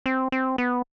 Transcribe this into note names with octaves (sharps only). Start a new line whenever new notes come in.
C4
C4
B3